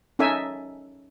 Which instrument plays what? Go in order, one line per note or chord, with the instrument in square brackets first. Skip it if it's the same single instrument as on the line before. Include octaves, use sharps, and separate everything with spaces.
[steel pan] C#4 D#4 A4 E5 G#5